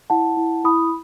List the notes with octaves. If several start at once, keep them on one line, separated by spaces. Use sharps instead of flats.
E4 F#5 A5
E4
E4 B5 D#6